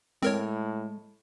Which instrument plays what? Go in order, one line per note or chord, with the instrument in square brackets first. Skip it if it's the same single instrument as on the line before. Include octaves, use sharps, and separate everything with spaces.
[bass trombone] A2 [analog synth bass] G#3 [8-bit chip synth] C4 A#4 C#5